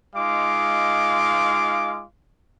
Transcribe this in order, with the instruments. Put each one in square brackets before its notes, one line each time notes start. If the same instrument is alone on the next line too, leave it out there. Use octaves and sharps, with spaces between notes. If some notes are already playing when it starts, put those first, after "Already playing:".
[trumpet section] G#3 D#4 F4 F5 D6